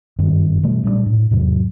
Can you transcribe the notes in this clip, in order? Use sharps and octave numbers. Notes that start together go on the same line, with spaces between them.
F#1 G2 D#3 C4
B2 E3 G3 A3
A#2 G3 A3 D4
A2
E2 G#2 C3 F#3